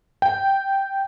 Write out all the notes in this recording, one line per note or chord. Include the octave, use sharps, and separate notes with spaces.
G5